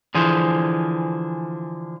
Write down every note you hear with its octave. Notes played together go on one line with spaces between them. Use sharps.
D3 E3 F3 G#4 C5